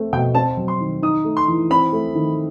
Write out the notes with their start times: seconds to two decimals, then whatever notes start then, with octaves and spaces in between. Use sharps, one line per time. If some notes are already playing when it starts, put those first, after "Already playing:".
Already playing: A3 C4
0.13 B2 G5
0.35 C4 A5
0.57 F#3
0.68 C6
0.81 D#3
1.02 D#4 D#6
1.24 A3
1.37 C6
1.48 E3
1.70 C4 B5
1.93 A3
2.15 D#3